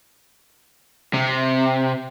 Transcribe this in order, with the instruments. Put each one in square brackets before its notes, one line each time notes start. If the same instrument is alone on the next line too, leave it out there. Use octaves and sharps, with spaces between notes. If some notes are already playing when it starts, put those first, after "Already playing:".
[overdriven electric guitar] C3